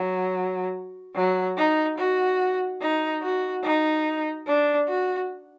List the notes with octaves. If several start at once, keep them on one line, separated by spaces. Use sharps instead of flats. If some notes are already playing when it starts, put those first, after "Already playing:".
Already playing: F#3
F#3
D#4
F#4
D#4
F#4
D#4
D4
F#4